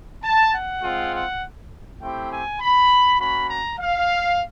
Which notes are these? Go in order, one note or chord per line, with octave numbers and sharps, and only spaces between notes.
A5
F#5
G#3 C4 F4
F#5
A3 C4 E4 G4 G5
G#5
B5
A#3 C#4 F#4 B5
A#5
F5